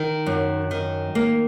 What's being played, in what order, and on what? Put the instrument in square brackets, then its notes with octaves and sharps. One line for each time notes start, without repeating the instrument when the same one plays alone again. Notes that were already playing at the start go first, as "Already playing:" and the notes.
Already playing: [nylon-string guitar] D#3
F#2
D#3
A#3